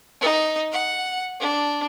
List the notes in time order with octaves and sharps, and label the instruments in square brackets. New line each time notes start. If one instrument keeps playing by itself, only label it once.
[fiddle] D#4
F#5
D4